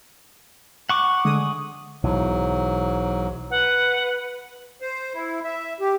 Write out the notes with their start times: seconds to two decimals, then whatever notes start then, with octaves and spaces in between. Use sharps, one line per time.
0.89 F#5 C#6 D6
1.25 D3 G#3 D#6
2.03 B1 G#2 E3 F#3
3.51 B4 F#5
4.82 C5
5.14 E4
5.44 E5
5.80 G4